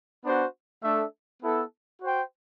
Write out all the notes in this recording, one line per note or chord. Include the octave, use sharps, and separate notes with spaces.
B3 D4 F#4 C5
A3 D4 A4 E5
B3 E4 A4
F#4 C5 G5